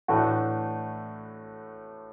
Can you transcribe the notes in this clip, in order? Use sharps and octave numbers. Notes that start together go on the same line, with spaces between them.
A2 E3 A3 D4 F#4